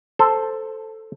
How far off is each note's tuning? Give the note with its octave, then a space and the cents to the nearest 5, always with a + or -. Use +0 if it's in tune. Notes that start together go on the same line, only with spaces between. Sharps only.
A4 +0 C5 +0